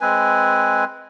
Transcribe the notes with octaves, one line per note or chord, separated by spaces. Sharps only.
G#3 C4 B4 G#5